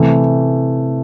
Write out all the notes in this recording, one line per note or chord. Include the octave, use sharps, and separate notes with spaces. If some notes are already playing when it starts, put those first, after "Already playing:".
Already playing: C3 E3 A3